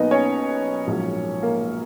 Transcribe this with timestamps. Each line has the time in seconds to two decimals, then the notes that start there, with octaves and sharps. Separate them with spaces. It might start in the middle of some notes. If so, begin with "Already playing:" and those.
Already playing: B1 B2 A#3 B3 D#4 B4 D#5
0.11 C#4 C#5
0.87 A#1 G#2 F#3 A#3
1.43 A#3 A#4